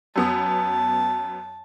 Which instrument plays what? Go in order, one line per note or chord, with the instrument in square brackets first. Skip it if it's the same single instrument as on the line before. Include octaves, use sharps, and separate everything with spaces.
[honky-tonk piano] F#2 B3 D#6 [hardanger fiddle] A5